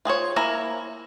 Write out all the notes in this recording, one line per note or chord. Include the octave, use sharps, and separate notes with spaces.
F4 G#4 C5 C#5
A#3 E4 G#5 A#5